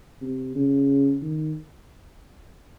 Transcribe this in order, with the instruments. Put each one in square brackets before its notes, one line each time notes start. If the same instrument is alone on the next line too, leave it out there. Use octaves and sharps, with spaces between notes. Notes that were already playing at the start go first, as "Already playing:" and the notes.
[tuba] C3
C#3
D#3